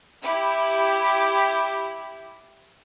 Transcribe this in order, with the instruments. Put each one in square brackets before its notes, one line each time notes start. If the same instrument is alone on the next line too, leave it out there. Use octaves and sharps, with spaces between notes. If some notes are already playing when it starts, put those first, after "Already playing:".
[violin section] E4 G4